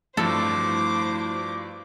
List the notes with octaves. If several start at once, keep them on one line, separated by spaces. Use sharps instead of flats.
G2 F3 A3 E4 F#4 A4 C5 D6